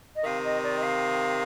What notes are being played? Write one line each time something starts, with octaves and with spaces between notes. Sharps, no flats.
D#5
C3 D#3 F5
D#5
D5
D#5
F5